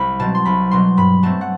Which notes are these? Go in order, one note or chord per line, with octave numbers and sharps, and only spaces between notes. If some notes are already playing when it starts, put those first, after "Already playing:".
Already playing: C2 B5
B2 F#3 C4 A5
C6
C2 B5
B2 F#3 C4 C6
G2 B5
F#3 A3 C4 A5
F#5